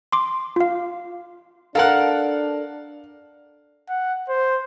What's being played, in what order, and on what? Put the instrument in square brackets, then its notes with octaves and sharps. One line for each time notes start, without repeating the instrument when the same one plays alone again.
[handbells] C6 D6
F4 F5
[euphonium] D4 [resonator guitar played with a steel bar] A4 A#4 F#5 [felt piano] F5 F6
[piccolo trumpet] F#5
C5